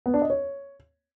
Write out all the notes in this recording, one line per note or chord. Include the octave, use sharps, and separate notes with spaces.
B3
D4
D#5
C#5